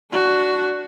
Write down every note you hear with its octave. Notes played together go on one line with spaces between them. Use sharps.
D4 F#4